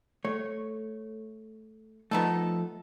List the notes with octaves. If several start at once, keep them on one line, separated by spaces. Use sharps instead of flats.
A3 C#5
F3 A3 B3 D#4 A4